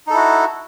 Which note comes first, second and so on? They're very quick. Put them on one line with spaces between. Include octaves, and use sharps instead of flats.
D#4 A4 E4 F#4